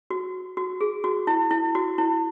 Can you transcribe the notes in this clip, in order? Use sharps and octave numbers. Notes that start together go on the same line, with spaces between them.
F#4
F#4
G#4
F#4
E4
E4
F#4
E4